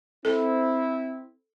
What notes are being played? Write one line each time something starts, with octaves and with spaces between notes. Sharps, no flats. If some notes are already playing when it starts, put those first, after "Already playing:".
C4 E4 A4